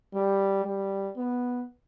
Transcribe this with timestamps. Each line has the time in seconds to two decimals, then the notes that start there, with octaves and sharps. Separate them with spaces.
0.14 G3
0.64 G3
1.16 B3